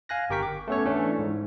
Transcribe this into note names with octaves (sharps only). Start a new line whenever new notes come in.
F5 G#5 F#6 A#6
G1 G4 A#4 G5 C#6 B6
D6
A3 B3 C#4 A4 C#5
E3 A3 C#4 D4
G#2